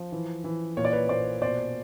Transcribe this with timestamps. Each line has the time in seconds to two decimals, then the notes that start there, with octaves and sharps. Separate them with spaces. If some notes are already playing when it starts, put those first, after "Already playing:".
Already playing: F3
0.12 E3
0.44 E3
0.77 A#2 C#5
0.85 D5
0.93 B4 C#5
1.09 A#2 C5 D5
1.42 B2 C5 D5